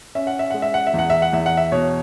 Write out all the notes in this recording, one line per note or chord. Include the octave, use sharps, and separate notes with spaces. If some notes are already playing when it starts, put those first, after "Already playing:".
C#4 E5
F#5
E5
G#3 F#5
E5
F#5
E5
E2 F#5
E5
F#5
E2 E5
F#5
E5
B2 C#5